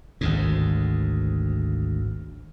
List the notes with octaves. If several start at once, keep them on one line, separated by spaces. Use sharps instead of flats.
G#1 D2 G#2